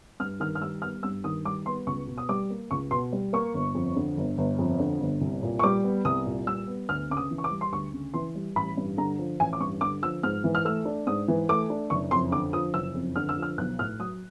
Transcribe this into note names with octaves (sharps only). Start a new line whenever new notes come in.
G2 F6
D#3 F6
F6
G3 E6
B3 F6
G2 E6
D#3 D#6
G3 D6
B3 C6
C#2 C#6
B2
D#6
G3 D6
A#3
C#2 C#6
B2 C6
G3
A#3 C#6
G1
F2
D3
G1
G1
F2
D3
G1
C2
A#2
C#6
G3 D6
B3
C2 D#6
A#2
G3 E6
B3
D2 F6
C#3 D6
D#6
E3
C#6
D6
G3
C6
D2 C#6
C#3
E3 C6
G3
A1 B5
G2
D3 A#5
F3
A1 G#5
D6
G2 C#6
D3 D6
F3 E6
G#2 F6
E3
F6
A3 E6
D4
G#2 D#6
E3
A3 D6
D4
F#1 C#6
F2 C6
D3 D6
F3 D#6
F#1 E6
F2
D3 F6
E6
F3 F6
B1 F#6
A2 F6
F#3 D#6